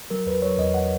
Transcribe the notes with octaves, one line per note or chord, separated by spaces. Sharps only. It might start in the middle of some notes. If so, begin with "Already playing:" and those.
F#3 A#4
E2 B4
F#3 C#5
E2 D#5
F#5